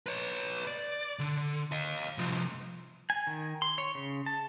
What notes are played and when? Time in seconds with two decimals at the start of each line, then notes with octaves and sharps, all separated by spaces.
0.06 B4 C#5
0.67 D5
1.19 D3
1.72 D#5 F5
2.18 C2 F3
3.10 G#5
3.27 D#3
3.62 C6
3.78 C#5
3.95 C#3
4.26 A5